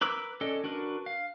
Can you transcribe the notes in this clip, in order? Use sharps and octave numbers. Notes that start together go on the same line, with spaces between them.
A#4 B4 D6 E6
C#4 A4 D5 D#5
D4 F#4 A#4 B4
F5